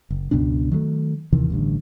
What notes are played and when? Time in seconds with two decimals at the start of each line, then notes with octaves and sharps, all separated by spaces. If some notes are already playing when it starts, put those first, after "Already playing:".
0.10 F#1
0.31 C#2 F#2 B2 D4
0.71 D#3 F#3 G3 A3
1.33 D#2 C3 D#3 E3
1.50 A1 G2 D3